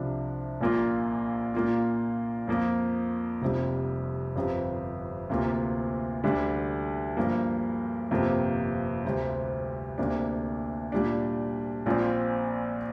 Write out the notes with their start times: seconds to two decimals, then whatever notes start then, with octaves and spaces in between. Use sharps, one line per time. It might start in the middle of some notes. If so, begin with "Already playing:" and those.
Already playing: C2 C3 F3 D4
0.61 A#1 A#2 A#3 F4
1.54 A#2 A#3 F4
2.48 F2 F3 A#3
3.42 F1 F2 C3 G3
4.35 G1 F2 C3 G3
5.30 D2 C3 A#3 F4
6.24 D2 D3 G3 D4
7.17 G2 F3 A#3
8.11 G1 F2 C3 A#3 G4
9.05 D2 C3 G3 C4
9.98 D2 C3 A#3 D4
10.92 A#2 G3 D4
11.86 A#1 A#2 F3 C4